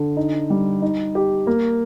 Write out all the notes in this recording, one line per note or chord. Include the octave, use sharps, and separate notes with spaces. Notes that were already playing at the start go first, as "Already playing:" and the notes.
Already playing: D3
D#4
G3
D#4
G4
A#3